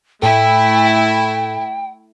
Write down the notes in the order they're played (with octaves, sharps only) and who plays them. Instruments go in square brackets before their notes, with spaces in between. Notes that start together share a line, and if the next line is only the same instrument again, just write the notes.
[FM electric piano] A2 A4 [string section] A3 E4 [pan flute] G5